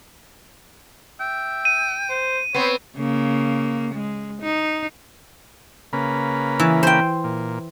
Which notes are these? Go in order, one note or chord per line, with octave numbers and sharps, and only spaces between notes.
E5 G5
D#7
C5
B3 C4 C5 C#5
C#3 A#3
G#3
D#4
C#3 A#3 B4
E3
C5 G5
A#2